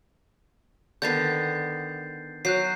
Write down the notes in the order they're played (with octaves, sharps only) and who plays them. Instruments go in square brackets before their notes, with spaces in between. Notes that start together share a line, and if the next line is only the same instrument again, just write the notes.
[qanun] D3 D#3 B3 [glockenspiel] G6 A6 C7
[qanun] F#3 [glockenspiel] F#6 G6 C7